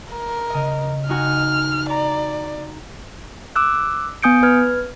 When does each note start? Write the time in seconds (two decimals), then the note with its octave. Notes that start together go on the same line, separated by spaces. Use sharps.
0.11 A#4
0.50 C#3 D#5
1.09 D#4 F#4 G#5 F6
1.90 D5 A#5
3.56 D6 E6 F#6
4.23 B3 G#5 D#6 G6 C#7 D7
4.43 B4 F6 G#6